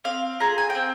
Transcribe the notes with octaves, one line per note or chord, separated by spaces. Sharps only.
C4 F5
F4 G#4 A#5
G#5
G5
C4